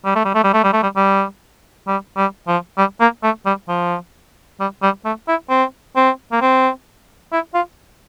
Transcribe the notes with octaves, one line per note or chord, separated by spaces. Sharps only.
G3
A3
G3
A3
G3
A3
G3
A3
G3
G3
G3
G3
F3
G3
A#3
A3
G3
F3
G3
G3
A3
E4
C4
C4
A#3
C4
E4
F4